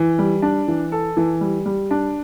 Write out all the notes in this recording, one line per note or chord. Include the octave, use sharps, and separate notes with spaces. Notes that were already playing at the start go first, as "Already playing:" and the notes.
Already playing: E3
G3
D4
E3
A4
E3
G3
G3
D4